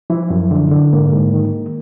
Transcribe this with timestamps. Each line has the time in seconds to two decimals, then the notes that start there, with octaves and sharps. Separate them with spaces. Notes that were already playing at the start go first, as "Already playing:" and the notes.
0.10 F3 E4
0.30 F#2
0.51 D3
0.71 D3
0.93 G#2 A#3
1.13 G#2
1.34 D#3